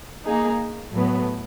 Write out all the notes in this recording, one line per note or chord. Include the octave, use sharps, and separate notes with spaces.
A#3 D#4 G#4
A2 F#3 B3